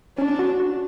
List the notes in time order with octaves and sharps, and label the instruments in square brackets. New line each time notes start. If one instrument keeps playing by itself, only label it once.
[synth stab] C#4 [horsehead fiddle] D4
[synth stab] F#4
F#4